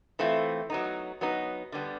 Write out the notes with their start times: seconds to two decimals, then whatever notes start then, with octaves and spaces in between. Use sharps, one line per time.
0.19 E3 A3 C4 F4
0.70 F#3 B3 D#4
1.21 F#3 B3 D#4
1.72 D3 G3 B3